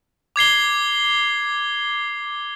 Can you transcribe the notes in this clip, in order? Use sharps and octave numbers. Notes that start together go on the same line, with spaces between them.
D6 G#6 C7 G7